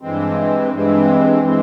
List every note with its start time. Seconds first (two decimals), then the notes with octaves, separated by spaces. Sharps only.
0.01 G2 E3 G#3 C4
0.72 G2 E3 G#3 C4
1.43 E3 G#3 C4